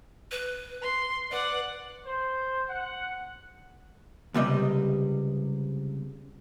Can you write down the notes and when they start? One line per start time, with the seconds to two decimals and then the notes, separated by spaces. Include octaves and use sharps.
0.31 B4
0.82 C6
1.31 B4 D5 F#5
2.06 C5
2.69 F#5
4.34 C#2 C3 G3 D#5